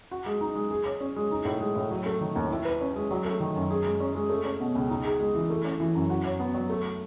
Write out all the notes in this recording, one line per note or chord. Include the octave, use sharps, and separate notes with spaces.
F#4
G#3
D#4
G#3
G#4
C#5
C#4
G#3
D#4
A2
G#3
A2
F#3
A3
D#3
D#2
E4
B4
C#4
G#3
F#3
A3
D#3
F#2
G#4
G#3
C#4
G#3
A3
C#4
B2
C#2
D#4
G#4
G#3
E3
A3
C#4
E3
F#2
F#4
C#5
B3
F#3
A3